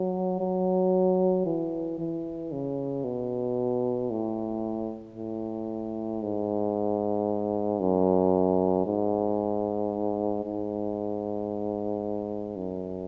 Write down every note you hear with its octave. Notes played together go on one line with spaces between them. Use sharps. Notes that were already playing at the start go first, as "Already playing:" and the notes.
Already playing: F#3
F#3
E3
E3
C#3
B2
A2
A2
G#2
F#2
G#2
G#2
F#2